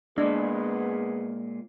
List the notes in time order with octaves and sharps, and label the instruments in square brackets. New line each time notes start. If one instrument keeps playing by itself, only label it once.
[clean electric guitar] A#2 G#3 [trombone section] B3 G#4 [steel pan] D4